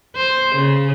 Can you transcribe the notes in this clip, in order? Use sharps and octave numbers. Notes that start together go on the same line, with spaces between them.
C5
C#3